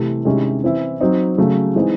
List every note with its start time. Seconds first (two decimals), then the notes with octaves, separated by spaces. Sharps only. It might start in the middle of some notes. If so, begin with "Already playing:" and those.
Already playing: C3 E3 A3
0.25 C3 D#3 G#3 C#4 E4
0.63 E3 C4 E4
1.01 F#3 C4 D#4
1.38 C#3 F#3 A3
1.76 E3 G#3 C4 D#4